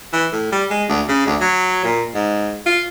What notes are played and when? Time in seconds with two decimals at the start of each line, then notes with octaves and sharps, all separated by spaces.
0.13 E3
0.32 A2
0.52 G3
0.70 G#3
0.89 D2
1.08 C#3
1.27 D2
1.40 F#3
1.84 A#2
2.14 G#2
2.66 F4